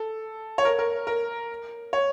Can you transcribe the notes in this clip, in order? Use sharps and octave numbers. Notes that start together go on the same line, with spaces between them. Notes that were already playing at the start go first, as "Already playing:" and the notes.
Already playing: A4
C#5
A#4
A#4
A#4
C#5